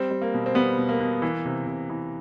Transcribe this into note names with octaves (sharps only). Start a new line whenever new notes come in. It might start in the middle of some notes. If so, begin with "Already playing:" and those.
Already playing: G3 C4
G3
A#3
B2
C4
G3 B3
B2
A#3
B2
E3
C3
C3
E3